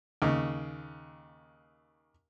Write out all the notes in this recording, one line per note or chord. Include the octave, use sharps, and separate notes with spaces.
D#2 C#3